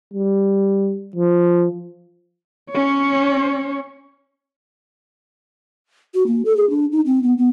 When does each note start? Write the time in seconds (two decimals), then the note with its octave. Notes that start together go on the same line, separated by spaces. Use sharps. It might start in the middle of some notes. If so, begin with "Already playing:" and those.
0.14 G3
1.16 F3
2.70 C#4 C#5
6.14 F#4
6.27 A#3
6.45 A4
6.57 G#4
6.70 D4
6.92 D#4
7.06 C4
7.23 B3
7.38 B3